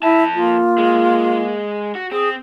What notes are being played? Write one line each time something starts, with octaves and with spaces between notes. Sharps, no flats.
F2 E4 E5 A5
A#3 F4
G#3
F#4
C4 G#4